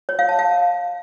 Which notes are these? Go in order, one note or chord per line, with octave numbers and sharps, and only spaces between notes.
C#5
F5
A5
F5